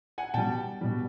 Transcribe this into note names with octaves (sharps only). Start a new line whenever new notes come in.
F#5 G#5
B2 G3 G5 A5
B2 G3